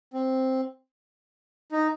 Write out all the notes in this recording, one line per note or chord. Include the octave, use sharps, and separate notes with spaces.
C4
D#4